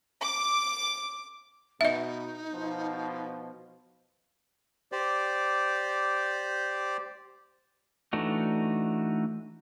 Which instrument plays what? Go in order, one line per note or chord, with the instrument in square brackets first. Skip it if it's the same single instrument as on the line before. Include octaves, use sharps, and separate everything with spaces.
[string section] D6
[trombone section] B2 [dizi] D#4 [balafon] D#5 E5
[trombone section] B2 F3
[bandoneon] G4 C5 D5
[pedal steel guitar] E3 A3 D4 D#4 F#4